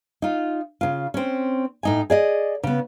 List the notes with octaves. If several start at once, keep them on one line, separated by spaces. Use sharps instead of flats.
D#4 F4
C#3 F4
C4 C#4
A2 D#4 G#5
G#4 D5 D#5
C#3 B3